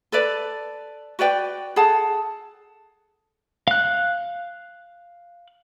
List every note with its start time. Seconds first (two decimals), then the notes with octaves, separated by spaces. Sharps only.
0.12 A4 B4 D5
1.19 F#4 B4 D5 G5
1.76 G#4 A4 F#5 A5
3.68 F5 F#6